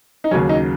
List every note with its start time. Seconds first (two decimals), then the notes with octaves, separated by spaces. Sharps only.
0.24 D#4
0.31 D#2 C#3 F#3 C#4
0.49 D#4